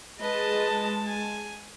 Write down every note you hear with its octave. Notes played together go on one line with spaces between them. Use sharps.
G#3 B4 D#5 A5
G#5